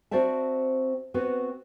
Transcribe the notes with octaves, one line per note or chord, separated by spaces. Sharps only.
C4 F#4 C5 D5 E5 A5
B3 C4 F#4 B4